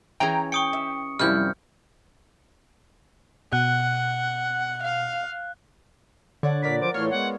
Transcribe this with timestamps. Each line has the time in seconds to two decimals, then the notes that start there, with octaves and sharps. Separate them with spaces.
0.20 E3 C#4 G#4 G5 A#5
0.52 G5 C#6 D#6 C#7
0.73 E5
1.19 F#2 C3 F3 G3 E4 F6 G6
3.53 B2 F#5 F#6
4.83 F5
6.43 D3 C#5 D5 F#5
6.62 A#2 A#4 D5 B5 B6
6.81 F3 C5 D6
6.94 A2 E3 A3 F4 C#5 C6 F6
7.11 G#3 B3 F#5